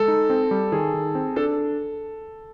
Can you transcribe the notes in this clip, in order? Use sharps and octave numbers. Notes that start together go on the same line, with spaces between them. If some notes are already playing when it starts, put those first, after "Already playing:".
Already playing: G#3 A4
D#4
C4
G3
D#3 G#4
D#3
C4
D4 A4